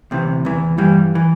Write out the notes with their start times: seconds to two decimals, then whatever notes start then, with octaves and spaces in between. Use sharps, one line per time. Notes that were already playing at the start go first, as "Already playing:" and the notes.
0.11 D2 C3 E3
0.45 E2 E3
0.78 G2 E3 G3
1.15 E3